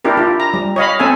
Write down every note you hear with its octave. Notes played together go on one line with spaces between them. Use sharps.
D4 E4 G4 A#4
E4 F4 G4
A#5
G3
C#5 D#5 F5 B5
C4 C#4 A4 E5 G#5